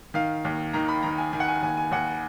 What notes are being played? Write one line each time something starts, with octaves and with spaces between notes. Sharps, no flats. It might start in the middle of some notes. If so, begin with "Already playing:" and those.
D#3 F5
D#2
D#3 A#5
B5
D#3 A#5
G#5
D#3 G#5
F#5
G#5
D#2 G#5
G#5
D#2 F#5